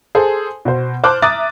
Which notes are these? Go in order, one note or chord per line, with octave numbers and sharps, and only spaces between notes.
G#4 A4 C5
B2 C5
C5 A5 D6 F6 F#6
E5 A#5 D6 D#6 F#6 A6